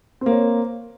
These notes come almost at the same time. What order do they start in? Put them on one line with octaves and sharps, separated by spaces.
C4 A#3 C#5